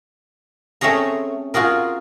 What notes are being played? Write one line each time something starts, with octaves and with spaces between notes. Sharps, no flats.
A3 C4 C#4 G#4 A#5
F4 F#4 G#4 A#4